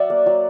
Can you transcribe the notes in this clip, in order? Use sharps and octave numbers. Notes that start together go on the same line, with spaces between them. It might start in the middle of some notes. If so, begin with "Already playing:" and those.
Already playing: F#3 D5 E5 F#5
A#3
F#3